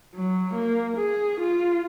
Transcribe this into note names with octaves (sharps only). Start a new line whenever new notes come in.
F#3
A#3
G#4
F4